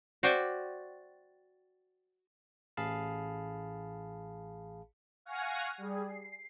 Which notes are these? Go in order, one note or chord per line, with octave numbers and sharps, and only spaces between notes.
F#4 C5 D5 E5 G5
A1 G#4 F5 A5 B5
F5 F#5 G#5 C#6 F6 A#6
G3 G#4
C7